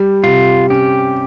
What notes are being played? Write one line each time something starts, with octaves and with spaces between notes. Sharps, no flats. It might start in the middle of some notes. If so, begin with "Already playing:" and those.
Already playing: G3
C3 F4
C#4 G4